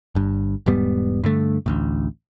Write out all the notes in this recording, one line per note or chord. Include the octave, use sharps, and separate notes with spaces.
G1 G2
E1 G#2 G3 B3
G2 D3 A3
A1 D2 A2